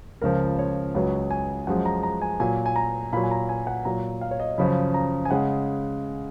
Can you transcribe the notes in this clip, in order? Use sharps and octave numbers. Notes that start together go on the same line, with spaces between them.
C#2 C#3 F3 A#4
C#5
C#2 C#3 F#3 B4
G#5
F#2 F3 G#3 F#5
A#5
A#5
G#5
A#2 F#3 G#5
G#5
A#5
A#2 F#3 B5
G#5
A#5
G#5
F#5
A#2 F#3 A#5
F5
C#5
D#5
F#2 C#3 F3 B5
A#5
G#5
C#3 G#3 F#5